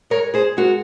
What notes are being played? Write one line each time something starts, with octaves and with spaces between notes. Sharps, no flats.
G#3 A#4 C#5
G#4 C5
G#3 F#4 A#4